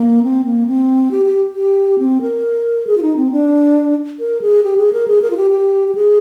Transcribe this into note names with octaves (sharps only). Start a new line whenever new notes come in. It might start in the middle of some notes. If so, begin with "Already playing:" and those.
Already playing: A#3
C4
A#3
C4
G4
G4
G4
C4
A#4
G#4
F4
D#4
C4
D4
A#4
G#4
G4
G#4
A#4
G#4
A#4
F4
G4
G4
G4
G#4